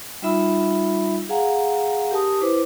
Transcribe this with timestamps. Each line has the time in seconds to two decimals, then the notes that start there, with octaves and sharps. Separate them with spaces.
0.22 G3 D#4 F4 E5 B5 E6
1.29 G#4 F5 F#5 G#5 A#5
2.11 G4 A#4 G#5 A5 D#6
2.41 E4 B4 C5 D6